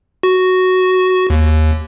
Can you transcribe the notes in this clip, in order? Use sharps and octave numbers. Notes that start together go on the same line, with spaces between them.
F#4
D#2